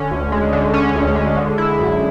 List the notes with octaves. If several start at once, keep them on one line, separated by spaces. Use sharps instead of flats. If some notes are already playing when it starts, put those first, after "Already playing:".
Already playing: D3 C#4
D2
G#3
D3
C#4
D2
G#3
D3
E4
F#2